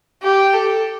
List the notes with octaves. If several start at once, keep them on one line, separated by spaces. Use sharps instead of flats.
G4
A4